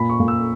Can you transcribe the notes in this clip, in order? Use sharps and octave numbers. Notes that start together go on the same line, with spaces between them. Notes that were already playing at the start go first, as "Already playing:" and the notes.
Already playing: A#2 B5
C#6
A#2
E6